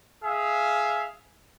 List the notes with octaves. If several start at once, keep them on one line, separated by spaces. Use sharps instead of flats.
G#4 E5 F5